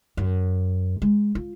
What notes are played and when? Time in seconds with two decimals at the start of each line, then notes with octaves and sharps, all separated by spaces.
0.17 F#2
1.02 G#3
1.35 F4